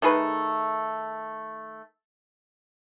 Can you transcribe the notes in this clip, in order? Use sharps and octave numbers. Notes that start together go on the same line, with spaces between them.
D#3 A3 G#4 B4